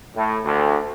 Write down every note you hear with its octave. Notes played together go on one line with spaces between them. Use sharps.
A2
D2